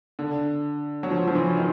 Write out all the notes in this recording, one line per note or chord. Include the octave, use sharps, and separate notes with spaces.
D3
F#3
F3
F3
E3
D#3